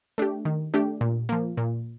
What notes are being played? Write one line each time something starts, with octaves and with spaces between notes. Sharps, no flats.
A3 D4 G4
D#3
A3 D4 G4
A#2
F3 A#3
A#2